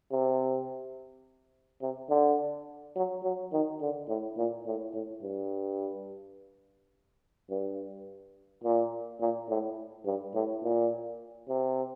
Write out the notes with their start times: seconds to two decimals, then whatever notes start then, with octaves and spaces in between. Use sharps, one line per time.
0.12 C3
1.81 C3
2.10 D3
2.96 F#3
3.23 F#3
3.52 D#3
3.81 D3
4.09 A2
4.37 A#2
4.66 A2
4.94 A2
5.23 G2
7.50 G2
8.64 A#2
9.20 A#2
9.49 A2
10.06 G2
10.34 A2
10.63 A#2
11.48 C3